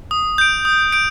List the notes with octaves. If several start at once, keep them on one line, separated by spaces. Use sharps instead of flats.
D#6
G6 D7
D#6
G6 D7